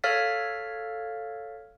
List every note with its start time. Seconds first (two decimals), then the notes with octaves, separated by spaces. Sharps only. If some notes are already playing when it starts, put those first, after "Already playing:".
0.04 A4 C#5 F5 F6 A6 B6